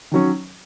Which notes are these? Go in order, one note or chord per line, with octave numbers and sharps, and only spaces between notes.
D#3 F#3 C#4